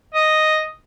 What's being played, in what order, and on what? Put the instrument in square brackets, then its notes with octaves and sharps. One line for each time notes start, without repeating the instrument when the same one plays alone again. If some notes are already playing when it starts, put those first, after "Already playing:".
[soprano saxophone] D#5